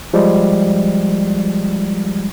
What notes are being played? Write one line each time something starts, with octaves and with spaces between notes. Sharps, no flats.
F3 G3 G#3